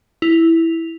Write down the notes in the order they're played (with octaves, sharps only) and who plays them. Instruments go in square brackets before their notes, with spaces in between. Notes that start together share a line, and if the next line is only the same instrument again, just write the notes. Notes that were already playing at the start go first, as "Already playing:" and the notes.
[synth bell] E4 F7